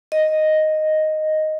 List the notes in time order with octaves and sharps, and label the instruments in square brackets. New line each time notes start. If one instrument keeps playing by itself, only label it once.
[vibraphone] D#5